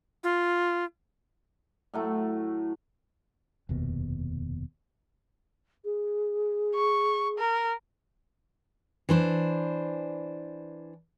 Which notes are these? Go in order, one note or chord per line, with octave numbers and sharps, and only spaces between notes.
F4
A2 F#3 A3
F1 D#2 B2
G#4
C#6
A#4
E3 D4 C5